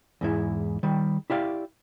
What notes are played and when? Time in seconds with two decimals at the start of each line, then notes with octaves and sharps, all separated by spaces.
0.21 E2 G#2 E4
0.83 D#3 G3
1.30 E4 G4 D5 F5